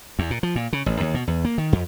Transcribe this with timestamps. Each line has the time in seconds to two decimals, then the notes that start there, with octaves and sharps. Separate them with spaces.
0.19 E2
0.31 A#2
0.43 F3
0.56 A#2
0.73 C#3
0.86 A1
1.00 D#2
1.14 B2
1.28 E2
1.45 A#3
1.58 D#3
1.73 F2